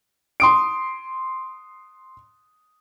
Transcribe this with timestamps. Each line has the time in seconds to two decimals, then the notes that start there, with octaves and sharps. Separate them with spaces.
0.40 C6 D#6 D7